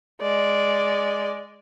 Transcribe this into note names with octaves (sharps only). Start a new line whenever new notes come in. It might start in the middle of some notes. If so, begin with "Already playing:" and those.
G#3 D5